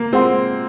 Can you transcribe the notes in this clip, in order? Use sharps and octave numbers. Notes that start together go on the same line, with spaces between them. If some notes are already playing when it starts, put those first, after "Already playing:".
Already playing: A#3
G#3 C4 F4 C5 F#5 C6